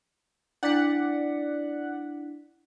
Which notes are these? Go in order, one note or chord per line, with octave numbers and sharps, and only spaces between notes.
D4 E4 D5 F#5 B6